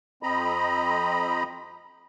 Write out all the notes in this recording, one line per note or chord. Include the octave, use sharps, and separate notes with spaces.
F2 C4 D#5 A#5 B5